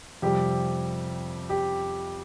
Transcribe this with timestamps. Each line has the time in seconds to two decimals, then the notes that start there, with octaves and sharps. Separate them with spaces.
0.22 F2 C3 G3 G4
1.50 G4